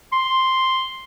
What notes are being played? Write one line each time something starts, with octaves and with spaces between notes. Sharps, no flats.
C6